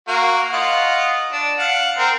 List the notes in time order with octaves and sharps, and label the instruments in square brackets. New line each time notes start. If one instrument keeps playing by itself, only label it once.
[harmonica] A#3 F#4
F4 D#5 F#5
D4
F5 F#5
C4 A#4